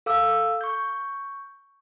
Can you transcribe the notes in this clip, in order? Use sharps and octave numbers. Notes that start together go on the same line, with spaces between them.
A4 F5 D6 E6
C#6 G6